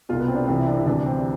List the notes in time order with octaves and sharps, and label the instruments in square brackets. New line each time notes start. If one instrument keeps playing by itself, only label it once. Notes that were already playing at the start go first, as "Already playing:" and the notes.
[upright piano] C2 B2 F4
B3
C4
D4
C2 C3 E3 C4
E4
D4
E4
D2 C3 E3 D4
C4